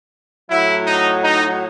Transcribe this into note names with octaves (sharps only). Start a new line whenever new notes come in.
A2 F#3 E4
D#4
D#4